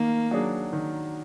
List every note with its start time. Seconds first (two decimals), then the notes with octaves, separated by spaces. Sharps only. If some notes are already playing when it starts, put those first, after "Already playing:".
Already playing: D#3 A#3
0.31 F#3 D4 G#4
0.73 D#3